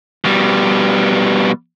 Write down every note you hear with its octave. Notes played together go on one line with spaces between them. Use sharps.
B2 G3